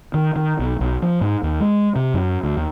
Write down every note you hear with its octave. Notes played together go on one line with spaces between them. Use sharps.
D#3
D#3
B1
B1
F3
G#2
D#2
G#3
C3
F#2
D2
D#2